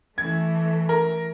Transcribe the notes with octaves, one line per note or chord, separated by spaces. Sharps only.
E3 A3 G#6
A#4